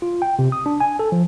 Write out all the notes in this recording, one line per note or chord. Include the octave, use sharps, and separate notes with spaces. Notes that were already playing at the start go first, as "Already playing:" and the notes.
F4
G5
C3
D#6
D4
G#5
A4
F3